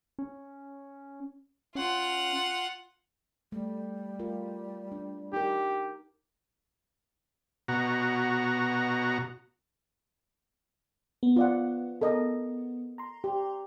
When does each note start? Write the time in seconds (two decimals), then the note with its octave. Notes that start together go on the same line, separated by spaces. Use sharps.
0.19 C#4
1.75 C#4 F4 F#5
3.52 G3 A3
4.19 A3 F4 A#4
4.92 D4
5.33 D#4 G4 A#4
7.68 B2 F#4 A#5
11.23 B3
11.36 F4 D5 F#5
12.01 A4 A#4 D#5
12.98 A#5 C6
13.24 G4